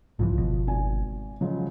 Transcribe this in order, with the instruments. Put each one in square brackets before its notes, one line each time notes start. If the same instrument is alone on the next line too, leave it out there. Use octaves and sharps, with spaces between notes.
[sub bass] C2 [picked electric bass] G#2 C#3 E3 [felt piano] F3
[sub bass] G1 [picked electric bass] B2
[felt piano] G#1 G#5
[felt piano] C#3 F3 G#3 [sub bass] F#3